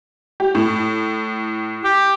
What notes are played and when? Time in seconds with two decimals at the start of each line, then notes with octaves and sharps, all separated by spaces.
0.40 G4
0.55 A2
1.85 G4